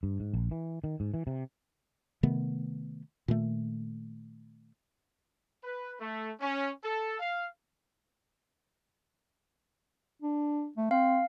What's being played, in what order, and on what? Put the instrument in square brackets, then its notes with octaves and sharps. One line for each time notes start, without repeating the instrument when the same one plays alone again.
[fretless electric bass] G2
G#2
A#1
E3
D#3
G#2
E3
C3
C3 D#3 A3 B3
A#2 D#3 A3
[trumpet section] B4
A3
C#4
A4
F5
[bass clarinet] D4
A3
[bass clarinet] C4 [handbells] F5